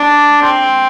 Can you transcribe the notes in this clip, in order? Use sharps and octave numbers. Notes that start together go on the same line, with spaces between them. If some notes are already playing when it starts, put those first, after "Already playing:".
Already playing: D4
C4